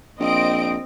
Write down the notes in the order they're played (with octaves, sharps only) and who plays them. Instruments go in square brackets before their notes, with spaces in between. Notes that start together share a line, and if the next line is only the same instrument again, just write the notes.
[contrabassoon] A#1 [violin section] C4 D#5 D7